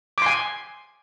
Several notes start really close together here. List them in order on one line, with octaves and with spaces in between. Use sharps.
D6 C6 G#5